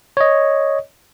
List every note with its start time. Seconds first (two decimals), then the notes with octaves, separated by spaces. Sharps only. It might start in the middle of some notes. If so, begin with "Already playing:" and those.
0.17 C#5 D#5